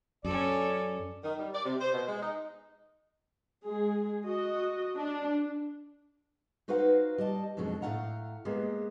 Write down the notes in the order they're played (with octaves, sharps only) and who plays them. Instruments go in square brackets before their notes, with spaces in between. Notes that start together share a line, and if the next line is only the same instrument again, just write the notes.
[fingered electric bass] F#2 [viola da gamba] C#4 A4 [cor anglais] D5
[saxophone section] D#3
G3
D5
C3
C5
B2
G#3
D#4
[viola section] G#3 G#4
F#4 D#5
D4
[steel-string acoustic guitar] D#4 F#4 B4 C5 F5 F#5
G3 D#5 A5
F2 B2 F#3 G#3 C#4 D4
A2 A3 C#4 F5 F#5 A#5
G#3 A#3 B3 G4 G#4